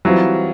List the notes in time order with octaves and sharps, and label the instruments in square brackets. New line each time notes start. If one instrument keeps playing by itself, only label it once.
[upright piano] E3 G3 C4 F4 [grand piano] F#3